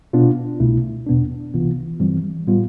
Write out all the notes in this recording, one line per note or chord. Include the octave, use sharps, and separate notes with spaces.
B2 B3 D4 F4
C2 B2 A3 E4
E2 B2 B3 D4
C2 C3 E3 B3 F4
G2 E3 G3 C4
A2 G3 B3 F4